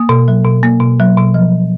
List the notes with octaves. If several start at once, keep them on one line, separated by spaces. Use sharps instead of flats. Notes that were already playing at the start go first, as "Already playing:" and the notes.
Already playing: A#3 D#6
B2
F#3
B2
A#3
B2
F#3
B2
F3